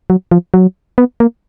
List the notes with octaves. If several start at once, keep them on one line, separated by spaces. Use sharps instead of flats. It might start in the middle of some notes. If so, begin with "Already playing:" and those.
F#3
F3
F#3
B3
A#3